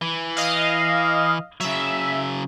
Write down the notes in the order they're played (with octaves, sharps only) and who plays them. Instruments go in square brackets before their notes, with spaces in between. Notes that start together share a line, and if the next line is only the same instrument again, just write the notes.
[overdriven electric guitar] E3
[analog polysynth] D#5 F5
[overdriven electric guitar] C#3 F#3 [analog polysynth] E5